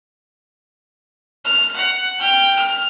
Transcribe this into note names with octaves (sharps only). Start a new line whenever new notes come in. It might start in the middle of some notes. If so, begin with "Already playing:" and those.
F6
F#5
G5 F6
F6